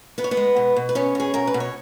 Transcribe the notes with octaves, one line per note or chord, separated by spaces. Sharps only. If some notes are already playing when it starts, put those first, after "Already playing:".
B3 B4
C#5
B3 B4
G#3
B2
B2
B4
B3 C#4 C#5
B2 G#4
B2 A#4
B4
B2
C#5